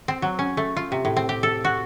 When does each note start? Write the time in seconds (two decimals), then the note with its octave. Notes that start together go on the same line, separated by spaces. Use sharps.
0.08 C4
0.22 F#3
0.39 C#4
0.57 A3
0.77 F4
0.92 C3
1.05 A2
1.17 C4
1.29 G4
1.43 A4
1.65 F#4